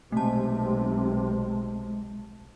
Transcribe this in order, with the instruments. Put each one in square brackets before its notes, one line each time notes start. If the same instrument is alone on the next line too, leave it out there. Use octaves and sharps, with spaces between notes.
[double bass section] B1 C3 [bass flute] G#3 [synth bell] A3 A5